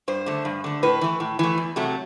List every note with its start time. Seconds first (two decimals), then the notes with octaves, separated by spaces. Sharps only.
0.08 G2 C5
0.26 D3 A3
0.45 G2
0.64 D3 A3
0.83 A2 B4
1.01 E3 A3
1.20 A2
1.39 E3 A3
1.58 E2
1.76 C3 F#3 A3